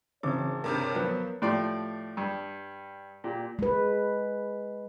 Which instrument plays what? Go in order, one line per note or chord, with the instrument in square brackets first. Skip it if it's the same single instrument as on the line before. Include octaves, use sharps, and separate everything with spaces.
[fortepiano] G#1 [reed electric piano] C#3 E3 C4 [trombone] C#5 [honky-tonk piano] D6
[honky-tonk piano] G2 C3 D#3 [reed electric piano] A#4
[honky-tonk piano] F3 [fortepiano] F#3 B3
[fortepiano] A2 F3 G4 D5 C6
G2
A#2 G4
[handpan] G#3 B4